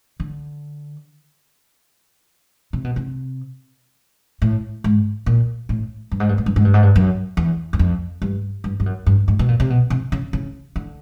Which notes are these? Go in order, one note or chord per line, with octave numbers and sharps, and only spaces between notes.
D3
C3
B2
C3
A2
G#2
A#2
A2
G2
G#2
G2
G#2
G2
G#2
G2
G#2
G2
F#2
E2
F#2
F2
G2
G2
G2
F#2
G2
G#2
B2
A#2
C3
B2
C3
C#3
C#3
D3